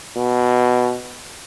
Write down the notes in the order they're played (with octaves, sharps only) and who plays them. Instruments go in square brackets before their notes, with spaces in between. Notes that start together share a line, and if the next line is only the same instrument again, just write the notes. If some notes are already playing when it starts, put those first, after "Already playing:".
[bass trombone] B2